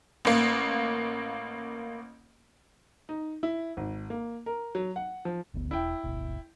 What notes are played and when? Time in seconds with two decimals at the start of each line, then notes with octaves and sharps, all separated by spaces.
0.25 A1 A#3
3.09 D#4
3.43 E4
3.77 G#1
4.10 A#3
4.46 A#4
4.75 F#3
4.96 F#5
5.25 F3
5.54 G1 D2 B3
5.71 E1 E4 G5
6.03 D1 G1 B2